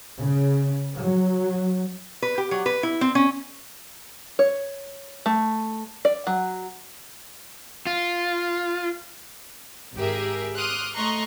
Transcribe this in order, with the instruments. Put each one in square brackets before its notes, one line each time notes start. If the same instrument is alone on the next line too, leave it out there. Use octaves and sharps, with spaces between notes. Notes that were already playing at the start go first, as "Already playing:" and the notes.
[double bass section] C#3
F#3
[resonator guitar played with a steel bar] B4
G4
F#3
B4
E4
C4
C#4
[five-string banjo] C#5
A3
D5
F#3
[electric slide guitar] F4
[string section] G#1 G4 G#4 A#4 E5
C6 D6 D#6 F6 F#6
A3 D#5 A#5 C6 C#6 F#6